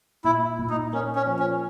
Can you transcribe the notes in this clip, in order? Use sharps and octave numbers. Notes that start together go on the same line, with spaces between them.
A#2 E4
A#2
D#4
A#3 C#4
C#4
F3
C#4